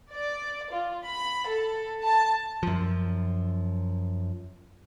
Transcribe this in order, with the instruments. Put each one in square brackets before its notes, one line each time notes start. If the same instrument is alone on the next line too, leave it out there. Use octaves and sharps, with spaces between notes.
[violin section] D5
F4
B5
A4
A5
[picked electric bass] F#2 F3